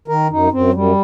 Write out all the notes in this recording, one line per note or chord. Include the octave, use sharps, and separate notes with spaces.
D#3 A#4
F#2 D#4
F#2 C4
F#3
F#2 G3